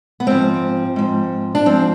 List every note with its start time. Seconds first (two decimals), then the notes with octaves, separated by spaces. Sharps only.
0.20 B3
0.27 G#2 F3 C4
0.96 G#2 F3
1.55 D4
1.66 G#2 F3 C4